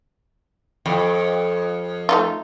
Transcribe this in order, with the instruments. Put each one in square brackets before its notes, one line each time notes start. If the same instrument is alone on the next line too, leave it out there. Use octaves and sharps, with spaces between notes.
[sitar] F2
[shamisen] A3 D#4 F4